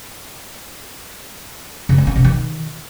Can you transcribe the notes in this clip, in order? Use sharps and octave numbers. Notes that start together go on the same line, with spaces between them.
C#3
G#3
C#4
C3
D#3